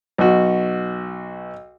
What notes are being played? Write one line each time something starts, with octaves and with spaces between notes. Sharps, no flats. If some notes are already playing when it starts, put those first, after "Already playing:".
B1 F#4